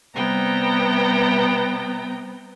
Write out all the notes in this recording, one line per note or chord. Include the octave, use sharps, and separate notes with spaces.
C3 G3 B3 G5 A#5